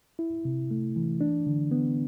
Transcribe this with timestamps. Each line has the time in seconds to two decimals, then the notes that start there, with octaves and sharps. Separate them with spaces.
0.19 E4
0.45 C3
0.71 A3
0.96 E3
1.21 D4
1.47 D3
1.71 B3